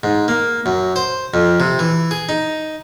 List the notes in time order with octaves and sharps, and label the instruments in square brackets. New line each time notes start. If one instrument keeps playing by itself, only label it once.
[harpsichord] G#2
A#3
F#2
C5
F2
C3
E3
G#4
D#4